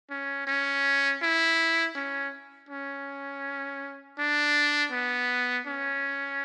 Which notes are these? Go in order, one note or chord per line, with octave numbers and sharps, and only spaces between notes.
C#4
C#4
E4
C#4
C#4
D4
B3
C#4